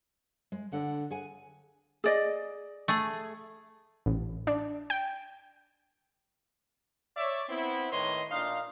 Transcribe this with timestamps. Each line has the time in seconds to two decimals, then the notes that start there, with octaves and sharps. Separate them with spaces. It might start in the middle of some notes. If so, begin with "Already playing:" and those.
0.52 G#3
0.73 D3 F#5
1.10 G#4 F#5 G#5
2.04 G#4 D5 D#5
2.88 A3 G#4
4.06 A1
4.47 D4
4.90 G5
7.16 C#5 D5 E5
7.49 B3 C4 E4
7.92 A2 D#3 B4 C#5 D#5 C6
8.31 A#2 D4 D#4 F5